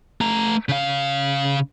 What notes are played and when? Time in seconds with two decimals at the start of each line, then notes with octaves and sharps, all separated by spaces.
0.21 A3 A#5
0.69 C#3 F5